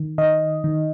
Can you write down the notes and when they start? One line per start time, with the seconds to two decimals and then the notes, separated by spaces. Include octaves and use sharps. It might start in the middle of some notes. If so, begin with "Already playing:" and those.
Already playing: D#3
0.18 D#3 D#5
0.64 D#3